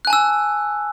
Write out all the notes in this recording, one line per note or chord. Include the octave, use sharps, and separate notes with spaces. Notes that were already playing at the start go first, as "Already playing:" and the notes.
G#5 A5 E6 F#6